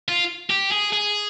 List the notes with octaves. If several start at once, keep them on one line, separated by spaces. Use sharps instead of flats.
F4
G4
G#4
G#4